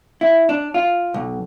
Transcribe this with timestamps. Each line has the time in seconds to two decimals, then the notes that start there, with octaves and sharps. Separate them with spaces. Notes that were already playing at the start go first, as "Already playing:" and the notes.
0.21 E4
0.49 D4
0.74 F4
1.14 B1